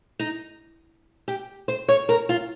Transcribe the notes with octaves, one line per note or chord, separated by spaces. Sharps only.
D#4
G4
C5
C#5
A#4
F4